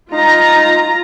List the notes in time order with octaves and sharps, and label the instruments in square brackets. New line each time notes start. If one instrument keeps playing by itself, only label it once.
[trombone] D#4 [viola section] F4 A#5